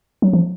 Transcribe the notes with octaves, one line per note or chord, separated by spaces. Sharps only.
F#3
F3